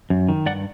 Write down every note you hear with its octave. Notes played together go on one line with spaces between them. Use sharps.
F#2
D#3
G2 D5 F#5